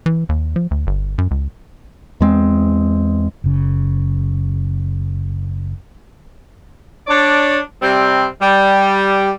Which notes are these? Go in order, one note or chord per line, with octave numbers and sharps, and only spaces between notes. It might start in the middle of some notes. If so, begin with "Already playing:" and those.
E3
D#2
F3
D2
G1
F#2
C#2
E2 G#3 C4
F#1 C#3
D4 C#5 D5
C3 G3 C4
G3